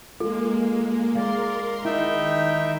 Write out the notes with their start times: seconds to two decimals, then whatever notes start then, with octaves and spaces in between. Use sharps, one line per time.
0.20 G#3 A#3 F4 A4
1.15 G#3 A#4 D5 F5 C6
1.85 D#3 D#4 E4 E5 G5